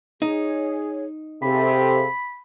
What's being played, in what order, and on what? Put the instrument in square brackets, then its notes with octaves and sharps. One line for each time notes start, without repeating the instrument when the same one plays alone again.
[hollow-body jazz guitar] D#4 [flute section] G#4 C#5
[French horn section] C3 [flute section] G#4 A4 F5 [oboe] B5